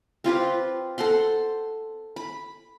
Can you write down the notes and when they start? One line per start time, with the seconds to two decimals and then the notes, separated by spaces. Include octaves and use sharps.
0.24 C4 F4 G4 B4
0.98 A4 C5 F#5 C6
2.16 B5